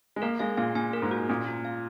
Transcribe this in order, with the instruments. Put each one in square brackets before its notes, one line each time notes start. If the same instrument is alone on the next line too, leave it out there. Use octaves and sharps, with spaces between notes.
[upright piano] G#3
[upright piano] A#3 [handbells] A#4
[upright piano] G#3 [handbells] F5
[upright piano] A#2 [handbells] F5
[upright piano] A#2 [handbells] G#5
[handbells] A#4
[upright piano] G#2
[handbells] F#4
[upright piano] A#2 [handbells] C#4
[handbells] F4
F5